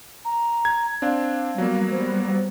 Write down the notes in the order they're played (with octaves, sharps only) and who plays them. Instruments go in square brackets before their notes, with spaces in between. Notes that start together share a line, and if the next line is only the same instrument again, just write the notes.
[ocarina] A#5
[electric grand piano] G#6
[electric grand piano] C4 D4 [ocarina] F5
[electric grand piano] F#3 A#3 [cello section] G3 B3
[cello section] G3 B3 [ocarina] C5